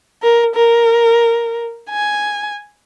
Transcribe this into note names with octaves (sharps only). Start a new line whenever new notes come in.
A#4
A#4
G#5